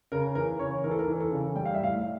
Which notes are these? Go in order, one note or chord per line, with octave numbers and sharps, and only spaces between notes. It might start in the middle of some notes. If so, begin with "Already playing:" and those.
C#3 A#4
E3 A#4
C#3 C#5
E3 A#4
A4
A#4
E3
A4
C#3
G3 G5
F5
E5
A2 F5